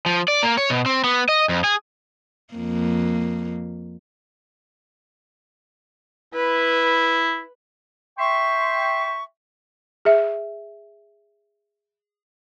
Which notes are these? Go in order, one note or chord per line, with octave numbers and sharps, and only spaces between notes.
F3
D5
A#3
C#5
B2
C4
B3
D#5
F2
G#4
F2 A#3
E4 B4
E5 G5 C6 C#6
G#4 E5